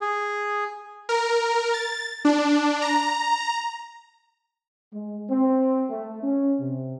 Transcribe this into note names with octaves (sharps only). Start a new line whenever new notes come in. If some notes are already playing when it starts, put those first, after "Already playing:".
G#4
A#4
A6
D4
A#5
G#3
C4
A3
C#4
C3